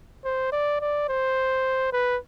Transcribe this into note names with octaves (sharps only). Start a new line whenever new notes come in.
C5
D5
D5
C5
B4